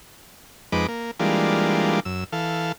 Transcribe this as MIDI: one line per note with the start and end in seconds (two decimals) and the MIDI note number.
0.72 0.87 41
0.72 0.87 56
0.72 0.87 63
0.72 0.87 71
0.72 0.87 86
0.88 1.11 58
1.20 2.00 52
1.20 2.00 55
1.20 2.00 56
1.20 2.00 58
1.20 2.00 62
1.20 2.00 65
2.05 2.24 42
2.05 2.24 88
2.33 2.72 52
2.33 2.72 69
2.33 2.72 77